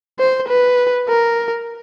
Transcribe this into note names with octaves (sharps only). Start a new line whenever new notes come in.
C5
B4
A#4